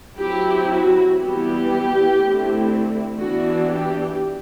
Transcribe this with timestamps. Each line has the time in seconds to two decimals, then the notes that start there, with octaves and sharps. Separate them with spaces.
0.18 F#3 C4 E4 G4
0.67 F#4
1.18 E3 G3 B3 E4 G4
2.18 D3 A3 C4 E4
3.18 E3 B3 D4 F#4
3.68 G4